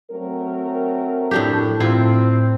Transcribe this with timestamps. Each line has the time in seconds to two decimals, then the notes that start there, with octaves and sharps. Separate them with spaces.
0.11 F#3 A3 C4 A#4
1.31 A2 D4 G4 A4
1.80 A2 C4 E4 F4